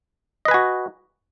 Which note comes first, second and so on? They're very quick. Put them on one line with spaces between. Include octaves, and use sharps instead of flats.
D#5 B4 G#5 F#4